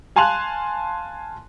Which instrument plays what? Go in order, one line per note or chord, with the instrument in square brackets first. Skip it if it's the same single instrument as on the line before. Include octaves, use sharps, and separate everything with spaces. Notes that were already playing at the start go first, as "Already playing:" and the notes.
[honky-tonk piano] F5 G#5 A5 C6 F#6 F7